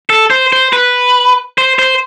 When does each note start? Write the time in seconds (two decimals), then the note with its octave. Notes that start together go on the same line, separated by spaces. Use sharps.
0.10 A4
0.30 C5
0.53 C5
0.73 B4
1.58 C5
1.79 C5